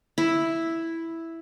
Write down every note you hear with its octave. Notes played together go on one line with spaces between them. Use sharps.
E4